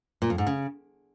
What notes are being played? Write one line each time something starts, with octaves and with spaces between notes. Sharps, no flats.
A#2
F2
G#2
C#3